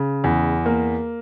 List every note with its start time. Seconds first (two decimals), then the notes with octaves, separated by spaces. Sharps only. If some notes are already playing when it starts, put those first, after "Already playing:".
Already playing: C#3
0.24 E2
0.66 A#3